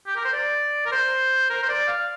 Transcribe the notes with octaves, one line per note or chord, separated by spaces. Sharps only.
G4
A#4
C5
D5
A#4
C5
A#4
C5
D5
F5